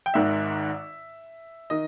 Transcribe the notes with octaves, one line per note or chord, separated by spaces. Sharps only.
G5
G#1 G#2 D#3 E5
D#3 D#5